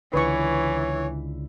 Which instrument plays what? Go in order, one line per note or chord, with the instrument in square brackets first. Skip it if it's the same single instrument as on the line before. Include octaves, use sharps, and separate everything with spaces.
[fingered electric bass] C#2 D3 [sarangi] E3 [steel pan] B4 C#6 [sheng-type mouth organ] C#5